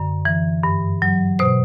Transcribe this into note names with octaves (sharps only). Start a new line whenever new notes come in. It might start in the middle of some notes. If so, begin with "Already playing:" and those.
Already playing: F#2 D3
E3
G2
F#3
B2 C5